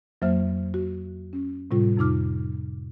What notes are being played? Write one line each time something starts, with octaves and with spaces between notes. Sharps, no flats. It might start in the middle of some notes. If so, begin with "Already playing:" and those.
F2 F#3 A#3 C5 E5 F6
F#4
C#4
A2 C3 G3 F4
F2 C3 D#4 D6 F6